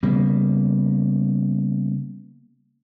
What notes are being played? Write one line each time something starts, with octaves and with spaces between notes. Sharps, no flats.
C#3 G3 A#3 B3